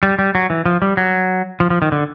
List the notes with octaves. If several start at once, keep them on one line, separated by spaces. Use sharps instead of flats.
G3
G3
F#3
E3
F3
G3
F#3
F3
F3
D#3
D3